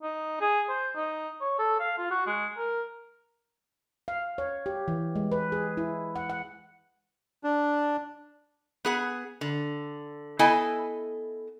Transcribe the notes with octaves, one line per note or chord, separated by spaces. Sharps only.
D#4
G#4
C5
D#4
C#5
A4
F5
F4
F#4
G#3
A#4
F5
C#5
G4
E3
G#3
B4
G#4
E4
F#5
F#5
D4
B3 G#4 F#5
D3
B3 E4 A4 D#5 G#5